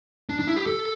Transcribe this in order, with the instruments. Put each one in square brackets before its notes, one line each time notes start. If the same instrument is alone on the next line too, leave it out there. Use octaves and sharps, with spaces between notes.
[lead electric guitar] D4
D4
E4
G4
A4